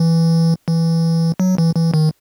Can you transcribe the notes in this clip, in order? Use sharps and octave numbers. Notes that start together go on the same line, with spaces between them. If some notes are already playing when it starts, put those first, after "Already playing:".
Already playing: E3
E3
F#3
E3
E3
D#3